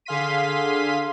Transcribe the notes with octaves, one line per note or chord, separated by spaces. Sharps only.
D3 G#4 F5 C6 B6 D#7